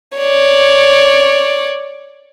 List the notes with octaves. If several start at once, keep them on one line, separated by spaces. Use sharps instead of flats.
C#5 D5